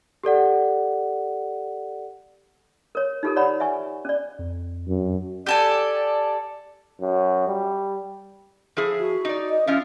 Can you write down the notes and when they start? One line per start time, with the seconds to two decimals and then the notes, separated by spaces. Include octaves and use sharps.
0.24 G4 A4 D5 F#5
2.95 A#4 C#5
3.23 D#4 F4 G4 A4 A#4
3.36 C#5 D5 F#5 A#5 B5
3.60 E5 G#5 C#6
4.05 C#4 D5
4.39 F2
4.88 F#2
5.46 G4 A4 D5 G#5
7.01 F#2
7.48 G3
8.77 F3 E4 G#4
8.99 F#4
9.25 D#4 D5
9.49 D#5
9.67 F3 C#4 E4 F4